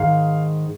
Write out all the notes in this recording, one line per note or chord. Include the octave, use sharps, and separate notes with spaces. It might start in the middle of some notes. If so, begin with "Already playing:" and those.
Already playing: G#2 D#3 G#3 F5